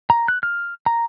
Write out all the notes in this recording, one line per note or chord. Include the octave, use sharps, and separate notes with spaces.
A#5
F#6
F6
A#5